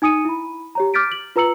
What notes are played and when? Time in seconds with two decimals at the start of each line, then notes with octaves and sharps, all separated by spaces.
0.02 D#4 G#5 D#6 C#7 D#7
0.25 E4 B5
0.75 G4 C#5 A#5
0.94 D6 F6 G6 A6 B6 D7
1.12 F#7
1.36 F4 B4 A#5 E6 C#7 F#7